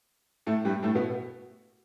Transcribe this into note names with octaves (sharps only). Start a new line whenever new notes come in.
A2 A3
G2 G3
A2 A3
B2 B3